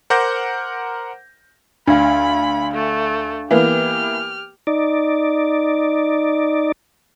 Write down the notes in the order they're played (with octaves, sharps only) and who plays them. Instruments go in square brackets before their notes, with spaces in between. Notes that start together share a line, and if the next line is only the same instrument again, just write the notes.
[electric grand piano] A#4 C5 F#5 D6 G6 A#6
[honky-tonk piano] D2 [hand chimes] D4 F5 [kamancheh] B5
[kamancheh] A3
[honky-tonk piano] E3 A#3 B3 [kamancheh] G4 F6
[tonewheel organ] D#4 D5